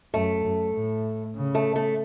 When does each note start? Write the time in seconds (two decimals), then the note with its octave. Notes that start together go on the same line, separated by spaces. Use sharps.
0.14 F#2 A3
0.44 F#2
0.74 A2
1.35 C#3
1.55 A3
1.76 A3